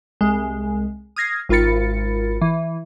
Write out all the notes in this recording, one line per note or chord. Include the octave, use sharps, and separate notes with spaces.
C2 G#3
D#6 F6 G#6 A#6 C7
G#1 F4 A#4 B5 A6 C#7
E3